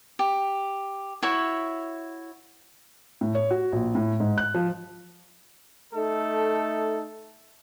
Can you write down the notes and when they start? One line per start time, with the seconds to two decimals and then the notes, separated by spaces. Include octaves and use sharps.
0.19 G4
1.23 E4 F#4 C#5 E5
3.21 A2
3.35 C#5
3.51 F#4
3.72 A#1
3.95 A2
4.20 G#2
4.38 F#6
4.54 F3
5.94 A3 D#4 A4